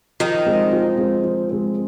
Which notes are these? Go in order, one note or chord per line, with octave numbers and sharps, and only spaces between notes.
D#3 F3 D#4
G#3 C4
F3
G#3 C4
F3
G#3 C4